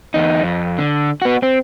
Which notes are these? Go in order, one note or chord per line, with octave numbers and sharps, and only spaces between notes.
E2 D#4
F2
D3
B3 F#4
C4